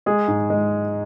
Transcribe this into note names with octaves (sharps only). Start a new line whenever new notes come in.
G#3 G#4
G#2
G#3